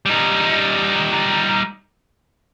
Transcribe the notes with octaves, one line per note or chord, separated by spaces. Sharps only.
G3 D#4